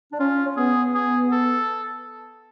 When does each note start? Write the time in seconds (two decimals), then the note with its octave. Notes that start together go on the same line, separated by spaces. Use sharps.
0.12 D4
0.19 C#4 F4
0.45 C#4
0.57 B3 G#4
0.94 G#4
1.32 A4